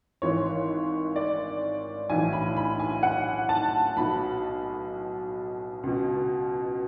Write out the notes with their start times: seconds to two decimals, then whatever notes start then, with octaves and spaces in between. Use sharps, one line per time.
0.22 G#1 G#2 E3 C#5
1.16 D5
2.10 B1 A2 E3 G#5
2.33 B5
2.57 B5
2.80 G#5
3.03 F#5
3.49 A5
3.97 B1 B2 B5
5.83 C#2 B2